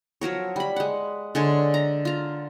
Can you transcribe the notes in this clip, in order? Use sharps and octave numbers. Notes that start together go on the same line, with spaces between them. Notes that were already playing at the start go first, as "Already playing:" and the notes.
F3 F#3 A#4 C#5
G3 B5
G#3 F#5
D3 G#3 C#5
A#5
F4 A#5